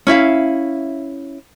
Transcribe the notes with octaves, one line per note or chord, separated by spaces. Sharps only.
C#4 E4 E5 F5